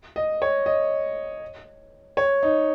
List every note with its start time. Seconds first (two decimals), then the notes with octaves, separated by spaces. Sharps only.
0.16 D#5
0.42 C#5
0.66 D#5
2.17 C#5
2.43 D#4